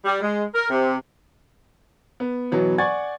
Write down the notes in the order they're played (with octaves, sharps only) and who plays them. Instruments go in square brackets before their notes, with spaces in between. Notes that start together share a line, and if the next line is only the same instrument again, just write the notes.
[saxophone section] G3
G#3
A#4
C3
[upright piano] B3
B2 E3 F#3 B3
D5 F#5 G#5 C#6 G#6 A6